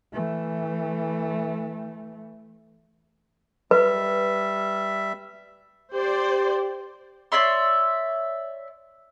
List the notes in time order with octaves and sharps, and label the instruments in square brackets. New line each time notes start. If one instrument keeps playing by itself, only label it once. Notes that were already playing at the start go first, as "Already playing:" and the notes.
[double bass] E3 A3
[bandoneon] G3 E5 [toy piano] B4
[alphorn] G4 [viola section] C5 D5
[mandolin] C#5 D5 E5 C6